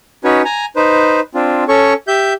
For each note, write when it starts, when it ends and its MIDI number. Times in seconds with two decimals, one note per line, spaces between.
0.24 0.42 61
0.24 0.42 63
0.24 0.42 66
0.24 0.42 71
0.24 0.42 73
0.45 0.65 80
0.45 0.65 82
0.76 1.20 63
0.76 1.20 71
0.76 1.20 72
1.35 1.64 60
1.35 1.64 62
1.35 1.64 65
1.68 1.93 61
1.68 1.93 69
1.68 1.93 73
1.68 1.93 85
2.08 2.33 67
2.08 2.33 76
2.08 2.33 91